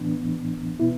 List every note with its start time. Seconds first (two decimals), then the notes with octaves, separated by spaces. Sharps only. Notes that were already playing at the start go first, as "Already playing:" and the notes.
Already playing: A2 E3 B3 D4
0.80 B2 B3 E4